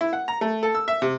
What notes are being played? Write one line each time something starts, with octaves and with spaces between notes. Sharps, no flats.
E4
F#5
A#5
A3
A4
E6
E5
C3